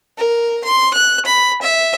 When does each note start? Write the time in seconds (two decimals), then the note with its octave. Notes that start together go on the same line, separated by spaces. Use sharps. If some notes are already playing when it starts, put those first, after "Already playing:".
0.18 A#4
0.64 C6
0.94 F#6
1.25 B5
1.62 E5